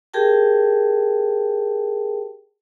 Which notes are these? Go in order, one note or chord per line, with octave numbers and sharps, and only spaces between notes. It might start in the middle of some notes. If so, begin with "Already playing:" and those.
G4 G#4 A#4 G5 A5